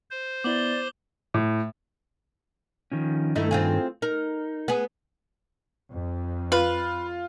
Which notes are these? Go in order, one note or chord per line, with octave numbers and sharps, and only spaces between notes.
C5
B3 E4 D5 D6 F#7 G7
A2
D#3 F3 C#4
G2 D#3 A3 D#4 E4
C4 F4 G#4
D#4 A#4
B3 G#4
F2
F4 B4